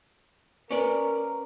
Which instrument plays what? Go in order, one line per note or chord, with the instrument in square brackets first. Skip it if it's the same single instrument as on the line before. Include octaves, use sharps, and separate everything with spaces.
[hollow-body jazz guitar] C#4 D5 [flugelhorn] A#4 [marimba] B4